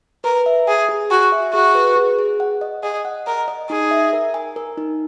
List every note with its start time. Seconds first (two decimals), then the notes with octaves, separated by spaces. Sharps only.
0.24 A#4 B4
0.46 E5
0.67 G#4 G#5
0.89 G#4
1.10 F#4 G#5
1.32 E5
1.53 F#4 G#4
1.75 B4
1.96 G#4
2.19 G#4
2.40 F#5
2.61 D#5
2.83 G#4 D#5
3.05 F#5
3.27 A#4 D#5
3.48 D#5
3.70 D#4 G#4
3.91 E5
4.13 A#4
4.34 G#5
4.56 A#4
4.78 D#4